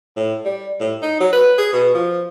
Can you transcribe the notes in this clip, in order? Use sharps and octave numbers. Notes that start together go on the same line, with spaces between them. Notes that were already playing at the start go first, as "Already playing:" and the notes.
A2
G3
A2
D#4
F#3
B4
G#4
B2
F3